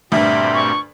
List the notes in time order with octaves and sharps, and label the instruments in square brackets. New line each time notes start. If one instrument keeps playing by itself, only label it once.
[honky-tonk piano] D2 G2 [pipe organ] A#2 C4 G4 [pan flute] E5
[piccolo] C#6